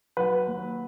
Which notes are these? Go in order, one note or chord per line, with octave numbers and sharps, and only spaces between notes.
F#3 B4
D#2